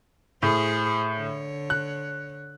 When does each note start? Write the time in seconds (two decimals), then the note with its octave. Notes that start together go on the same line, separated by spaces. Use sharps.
0.43 A2 G#4 C5
1.15 D3 C#5
1.70 F#6